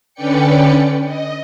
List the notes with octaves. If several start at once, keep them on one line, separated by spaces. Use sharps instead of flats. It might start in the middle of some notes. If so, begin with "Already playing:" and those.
D3 C#4 B4 D5 G5 C#7
D#5